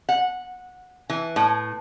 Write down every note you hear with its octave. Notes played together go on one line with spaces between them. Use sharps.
F#5
E3
A2